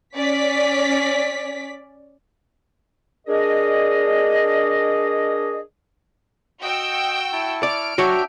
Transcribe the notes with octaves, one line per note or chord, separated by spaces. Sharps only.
C#4 D5 B6
D4 G#4 A#4 D#5
F#4 D#5 G5 E6
E4 A5 C#6
D5 F6 D7
D4 F#4 C#5 E5 G5